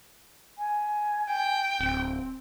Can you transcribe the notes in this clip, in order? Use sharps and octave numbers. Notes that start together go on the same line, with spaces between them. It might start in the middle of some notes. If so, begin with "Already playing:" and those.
G#5
G5
D1 C4